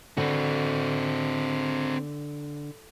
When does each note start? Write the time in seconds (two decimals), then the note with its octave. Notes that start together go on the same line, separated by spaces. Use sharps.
0.17 D3 C4 F#4